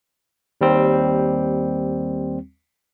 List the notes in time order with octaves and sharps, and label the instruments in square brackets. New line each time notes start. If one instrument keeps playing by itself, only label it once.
[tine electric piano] D#2 G3 C4